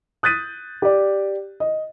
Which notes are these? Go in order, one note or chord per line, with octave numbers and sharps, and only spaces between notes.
D#6 F#6 G6 A6 B6 D#7
G4 D5
D#5